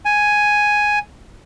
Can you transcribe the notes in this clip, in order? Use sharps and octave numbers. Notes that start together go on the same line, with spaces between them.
G#5